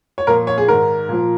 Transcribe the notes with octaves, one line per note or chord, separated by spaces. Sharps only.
C#5
A#2 F3 A#4
C#5
G#4
G#2 D#3 A#4
A#2 F3